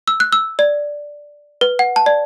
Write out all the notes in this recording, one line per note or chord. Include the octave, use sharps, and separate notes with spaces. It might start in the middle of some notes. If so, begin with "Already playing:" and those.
E6
F#6
E6
D5
B4
F#5
A5
D5